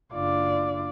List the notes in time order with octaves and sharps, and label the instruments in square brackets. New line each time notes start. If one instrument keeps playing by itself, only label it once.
[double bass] F#1 D4 [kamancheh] F4 D5